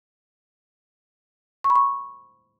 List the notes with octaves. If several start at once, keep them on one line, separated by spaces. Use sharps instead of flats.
C#6
B5
C#6